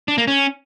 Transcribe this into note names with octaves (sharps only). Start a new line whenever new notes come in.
D4
A#3
C#4